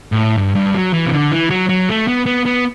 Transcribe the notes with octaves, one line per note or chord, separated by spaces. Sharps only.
A2
G2
G2
F#3
E3
C3
D3
E3
F#3
F#3
A3
B3
B3
B3